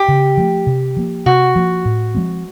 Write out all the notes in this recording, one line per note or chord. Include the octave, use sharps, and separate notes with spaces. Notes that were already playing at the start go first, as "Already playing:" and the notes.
Already playing: G4
C#3
F3 A3
C3
F3 A#3
C3 F#4
F3 A#3
A2
F3 G#3 C4